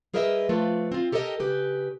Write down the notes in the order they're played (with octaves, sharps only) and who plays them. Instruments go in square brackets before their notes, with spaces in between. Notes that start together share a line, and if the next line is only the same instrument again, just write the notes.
[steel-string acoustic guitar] G3 G#4 A#4 B4 D#5 E5
F3 A3 F4 B4 D5
C4 F4
G4 A4 A#4 C#5 D#5 G5
C#3 G4 B4